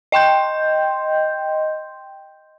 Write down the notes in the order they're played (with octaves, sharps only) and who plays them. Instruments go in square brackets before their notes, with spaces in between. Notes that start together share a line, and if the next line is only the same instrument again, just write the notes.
[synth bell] D#5 G5 C6 G6